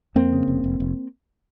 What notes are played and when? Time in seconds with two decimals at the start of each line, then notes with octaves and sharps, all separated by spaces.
0.15 F2 A#3 C4
0.33 C#3
0.48 F1
0.64 F1
0.80 F1